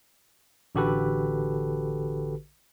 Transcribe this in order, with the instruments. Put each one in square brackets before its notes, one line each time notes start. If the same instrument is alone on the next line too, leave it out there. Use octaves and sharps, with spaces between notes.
[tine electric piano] A1 D3 F#4 G4 A4 B4